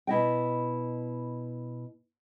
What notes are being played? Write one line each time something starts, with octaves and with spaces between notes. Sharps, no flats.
B2 E4 D#5 G5